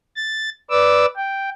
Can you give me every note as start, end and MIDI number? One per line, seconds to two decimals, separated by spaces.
0.16 0.50 93
0.70 1.06 71
0.70 1.06 74
0.70 1.06 86
0.70 1.06 88
1.16 1.49 79